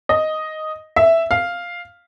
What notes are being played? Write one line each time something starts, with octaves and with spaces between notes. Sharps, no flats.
D#5
E5
F5